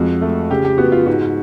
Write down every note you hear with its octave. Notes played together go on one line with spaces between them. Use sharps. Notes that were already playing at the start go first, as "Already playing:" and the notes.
Already playing: F2 G#3 F#4
A3
C#3 G4
G4
B3 F#4
F4
G#2 F#4